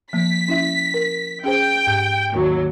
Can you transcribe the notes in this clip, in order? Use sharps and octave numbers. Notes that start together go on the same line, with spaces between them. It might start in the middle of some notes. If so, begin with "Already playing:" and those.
F3 A#3 B6
C#4 E4 E5
A#4
C#4 G#4 C5 G5
G#2 G6
D#2 F#3